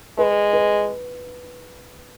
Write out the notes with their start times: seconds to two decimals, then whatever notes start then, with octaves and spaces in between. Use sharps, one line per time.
0.18 G#3 B4
0.53 B4